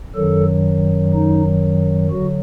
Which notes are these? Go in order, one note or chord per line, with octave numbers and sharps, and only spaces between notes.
F#2 D#3 F#3 A4
D#4
D3 F#3 F#4